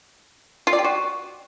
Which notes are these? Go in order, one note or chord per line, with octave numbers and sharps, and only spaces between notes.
F4
D5
G4
F#4